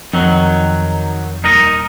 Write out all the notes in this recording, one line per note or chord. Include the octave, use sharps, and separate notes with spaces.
F2 D#3 F#3 D#4
D#1 D#4 A#4 D#5